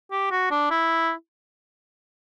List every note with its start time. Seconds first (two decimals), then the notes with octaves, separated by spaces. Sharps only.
0.11 G4
0.31 F#4
0.51 D4
0.70 E4